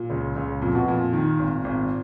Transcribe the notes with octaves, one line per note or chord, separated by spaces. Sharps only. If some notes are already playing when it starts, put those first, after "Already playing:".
Already playing: A#2
C#2
C#2
F2 A#2
B2
F2 A#2
D#3
G#1
G#1